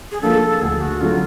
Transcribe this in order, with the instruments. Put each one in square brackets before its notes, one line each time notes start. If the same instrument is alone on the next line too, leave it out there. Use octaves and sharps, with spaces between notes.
[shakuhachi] G#4
[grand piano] F3 A#3 D4 [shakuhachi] A4
[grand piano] D2 [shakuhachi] G#4
[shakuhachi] F#4
[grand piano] D3 F#3 A3 [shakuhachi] F4